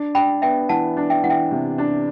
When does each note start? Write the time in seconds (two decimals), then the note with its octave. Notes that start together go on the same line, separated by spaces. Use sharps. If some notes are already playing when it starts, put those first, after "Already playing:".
Already playing: D4
0.15 D4 G5 B5
0.42 B3 E5 G5
0.69 E3 F#5 A5
0.97 D4
1.10 E5 G5
1.24 E3 F#5
1.30 E5 G5
1.51 C3
1.78 D4